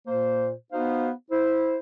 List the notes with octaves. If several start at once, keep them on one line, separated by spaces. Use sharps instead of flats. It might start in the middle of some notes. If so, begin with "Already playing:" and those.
A#2 A#3 C5
B3 D#4 F#4 C5 F5
E4 C5